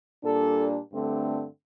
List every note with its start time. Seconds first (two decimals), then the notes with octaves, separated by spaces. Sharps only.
0.24 A#2 G3 D4 A4
0.92 G2 D3 A3 C4